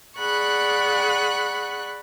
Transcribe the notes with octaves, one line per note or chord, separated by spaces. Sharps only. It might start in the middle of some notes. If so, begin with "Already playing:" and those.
G#4 D5 F#5 B5 C#6 F#6